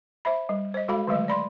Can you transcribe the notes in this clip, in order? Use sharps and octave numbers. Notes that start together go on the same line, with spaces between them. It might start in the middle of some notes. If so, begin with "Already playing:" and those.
C5 E5 B5
G3
C5 D#5
G#3 F#4 A4 F5 B5
D3 D#3 F#3 G#3 A3 D#5
D5 B5 C6